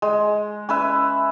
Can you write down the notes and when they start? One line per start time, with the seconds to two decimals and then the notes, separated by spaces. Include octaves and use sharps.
0.02 G#3
0.69 C#4 B4 E5